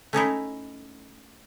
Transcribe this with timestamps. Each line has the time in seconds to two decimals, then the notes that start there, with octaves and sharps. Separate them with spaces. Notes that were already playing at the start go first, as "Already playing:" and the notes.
0.13 A3 C#4 D#4 E4